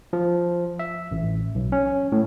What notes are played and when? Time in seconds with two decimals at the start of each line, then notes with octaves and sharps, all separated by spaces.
0.13 F3
0.79 E5
1.11 A1
1.55 B1
1.72 C#4
2.12 A2